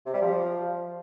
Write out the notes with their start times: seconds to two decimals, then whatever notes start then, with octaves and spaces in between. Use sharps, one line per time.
0.05 C3
0.13 G3
0.21 F3